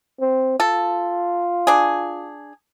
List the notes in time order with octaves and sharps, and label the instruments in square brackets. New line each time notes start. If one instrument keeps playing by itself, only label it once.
[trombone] C4
[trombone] F4 [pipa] A4
[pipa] D4 G#4